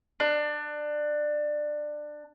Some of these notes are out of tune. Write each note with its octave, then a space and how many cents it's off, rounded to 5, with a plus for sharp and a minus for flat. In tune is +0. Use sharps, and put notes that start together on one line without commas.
D4 +20